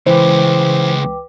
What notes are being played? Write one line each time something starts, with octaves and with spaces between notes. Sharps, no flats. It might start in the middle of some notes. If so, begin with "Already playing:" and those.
C#2 E3 B4 C5 G5 D6